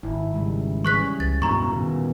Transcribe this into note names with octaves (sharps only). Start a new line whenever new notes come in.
G#1 E4
C#3 G3 G#3
E3 G3 C#4 G#4 C#6 F#6 B6
C#2 A6
E2 G2 B2 A#5 C#6
A#2 D#3 B3